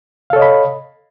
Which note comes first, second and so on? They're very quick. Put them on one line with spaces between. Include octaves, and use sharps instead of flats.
F5 A4 C#5 D#5 B5